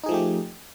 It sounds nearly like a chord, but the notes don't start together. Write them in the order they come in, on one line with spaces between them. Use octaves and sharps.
D#4 G#4 F3 A3 G4